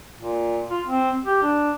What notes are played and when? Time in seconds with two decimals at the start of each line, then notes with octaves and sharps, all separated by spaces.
0.19 A#2
0.70 F4
0.86 C4
1.26 G4
1.42 D4